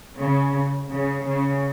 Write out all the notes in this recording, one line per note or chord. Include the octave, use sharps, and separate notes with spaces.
C#3
C#3
C#3